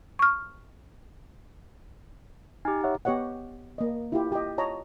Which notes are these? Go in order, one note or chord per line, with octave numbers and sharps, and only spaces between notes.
C#6 F6
D#4 G4 G#5
C#5 E5 F#5
B3 G4 C#5 D#5 F#5
A#3 D#5
E4 F4 G4
G4 D#5
F4 C#5 D#5 A5 A#5